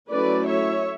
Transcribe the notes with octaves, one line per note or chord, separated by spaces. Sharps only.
F#3 A3 C#4 E4 B4 D5
C#5 E5